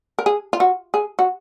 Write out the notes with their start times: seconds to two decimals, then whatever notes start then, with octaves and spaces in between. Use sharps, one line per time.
0.19 A#4
0.26 G#4
0.53 F4
0.60 F#4
0.94 G#4
1.19 F#4